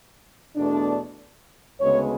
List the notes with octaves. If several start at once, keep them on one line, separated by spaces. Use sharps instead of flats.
E2 B2 A3 D4
D2 C#3 G#3 B3 C#5